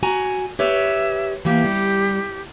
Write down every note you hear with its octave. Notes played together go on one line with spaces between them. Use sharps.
F#4 G#5 A#5
G4 B4 C#5 E5
E3 A#3 G4
G3